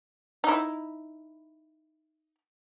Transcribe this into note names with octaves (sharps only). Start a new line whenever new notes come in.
D#4 E4